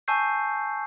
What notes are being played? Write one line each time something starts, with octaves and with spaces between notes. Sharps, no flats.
G#5 A5 C#6 E6 G6 C7